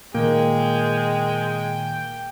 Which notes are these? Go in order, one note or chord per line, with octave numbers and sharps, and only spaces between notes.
A#2 D#3 G#3 A#3 G5